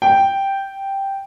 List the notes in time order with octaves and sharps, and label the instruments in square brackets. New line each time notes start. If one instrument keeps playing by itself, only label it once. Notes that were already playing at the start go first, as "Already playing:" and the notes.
[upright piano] G5